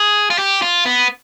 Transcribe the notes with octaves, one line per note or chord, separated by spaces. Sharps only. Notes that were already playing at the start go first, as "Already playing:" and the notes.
Already playing: G#4
F4
G4
F4
B3